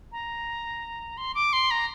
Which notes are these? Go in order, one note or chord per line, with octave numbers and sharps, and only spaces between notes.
A#5
C6
D6
C6
A#5